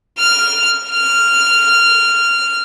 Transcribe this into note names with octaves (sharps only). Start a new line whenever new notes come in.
F6
F6